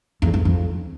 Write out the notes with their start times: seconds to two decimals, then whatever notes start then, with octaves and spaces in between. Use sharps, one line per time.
0.22 E2
0.34 E2
0.45 F2